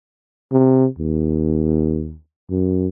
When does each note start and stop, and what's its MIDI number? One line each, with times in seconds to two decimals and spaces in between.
0.52 0.86 48
0.99 2.17 39
2.50 2.87 42